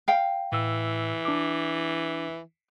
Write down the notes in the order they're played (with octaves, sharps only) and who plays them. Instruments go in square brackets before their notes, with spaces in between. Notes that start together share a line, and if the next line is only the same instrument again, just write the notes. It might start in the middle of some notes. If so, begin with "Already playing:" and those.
[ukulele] F5 G5
[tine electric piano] A2 E6 [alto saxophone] E3
[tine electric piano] D4 D6